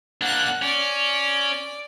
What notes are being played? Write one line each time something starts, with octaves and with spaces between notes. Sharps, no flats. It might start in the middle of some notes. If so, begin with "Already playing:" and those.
A#3 D4 F#5 F#6
C#4 D5